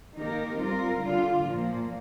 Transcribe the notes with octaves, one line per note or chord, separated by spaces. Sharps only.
D#3 A#3 D#4 G4 A#4
G3 C4 F4 A#4
D3 G3 D4 F4
A#2 F3 A#3